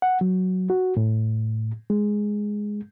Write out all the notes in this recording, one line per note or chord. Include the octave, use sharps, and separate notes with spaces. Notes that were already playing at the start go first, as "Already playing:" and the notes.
F#5
F#3
F#4
A2
G#3